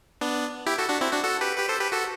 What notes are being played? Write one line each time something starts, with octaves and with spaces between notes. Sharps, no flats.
B3 D4
E4 G4
F#4 A4
D4 F#4
C4 E4
D4 F#4
F#4 A4
G4 B4
G4 B4
A4 C5
G4 B4
F#4 A4